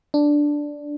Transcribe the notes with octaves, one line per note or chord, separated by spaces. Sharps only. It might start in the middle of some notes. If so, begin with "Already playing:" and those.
D4